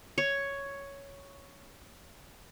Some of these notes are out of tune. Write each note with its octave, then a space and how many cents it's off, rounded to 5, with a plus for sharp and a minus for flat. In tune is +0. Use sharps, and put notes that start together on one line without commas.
C#5 +5